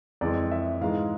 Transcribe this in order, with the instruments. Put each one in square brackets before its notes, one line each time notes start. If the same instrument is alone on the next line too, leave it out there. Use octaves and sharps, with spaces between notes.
[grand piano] F2 E3 G#3 D5
E5
G#2 E3 G#3 F5